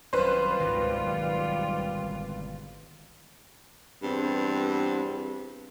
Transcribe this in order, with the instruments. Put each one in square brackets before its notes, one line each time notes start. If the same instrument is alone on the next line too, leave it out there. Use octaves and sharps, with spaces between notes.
[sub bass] G#1 [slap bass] F#2 [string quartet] G3 F4 [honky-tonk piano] B4 C5
[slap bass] G#1 B2 D#3 [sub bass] C#2
[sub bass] B1
G1
[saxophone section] E2 G2 C4